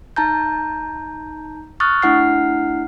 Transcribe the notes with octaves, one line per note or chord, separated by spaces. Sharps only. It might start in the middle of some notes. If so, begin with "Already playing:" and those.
D#4 A5 A#5 G6
C#6 D#6 F6 F#6 A6
A3 D4 E4 F#5 F6 C7